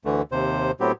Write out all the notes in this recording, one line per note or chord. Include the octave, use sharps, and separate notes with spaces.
D2 D3 E3 A3
D#2 C3 C5
A2 F#3 B3 C4 G4